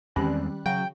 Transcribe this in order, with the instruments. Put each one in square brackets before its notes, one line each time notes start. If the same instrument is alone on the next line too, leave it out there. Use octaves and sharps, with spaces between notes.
[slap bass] E2 G#3 C4 [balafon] D#3 C#4 [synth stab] G3 F#6
[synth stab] C#3 F#4 [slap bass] F#3 [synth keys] G5